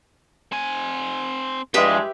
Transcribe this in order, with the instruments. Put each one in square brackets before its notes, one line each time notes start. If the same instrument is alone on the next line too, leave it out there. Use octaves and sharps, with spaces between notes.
[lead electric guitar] C4 G#5
[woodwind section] G2 E3 G#3 [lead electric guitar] F3 [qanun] G4 B4 E5